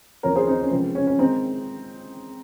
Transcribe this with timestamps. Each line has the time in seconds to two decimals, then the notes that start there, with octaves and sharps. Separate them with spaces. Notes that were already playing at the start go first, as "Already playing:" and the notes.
0.23 D#2 C#3 F3 C4 A#4 C#5
0.35 G#4 C5
0.47 C4 D#4
0.59 C#4
0.71 C#2 C3 F3 G#3 C4
0.95 C#4
1.07 C#4
1.19 D#3 G#3 C4 D#4